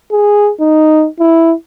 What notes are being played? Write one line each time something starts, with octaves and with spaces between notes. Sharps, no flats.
G#4
D#4
E4